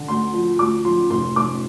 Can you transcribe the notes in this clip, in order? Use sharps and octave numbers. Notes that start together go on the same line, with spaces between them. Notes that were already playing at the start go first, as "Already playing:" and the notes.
Already playing: D3
D2 C6
F3
D2 D6
F3 C6
F1 C6
F1 D6